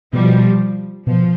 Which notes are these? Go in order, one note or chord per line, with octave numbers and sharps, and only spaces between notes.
B2 F3 G3
B2 F3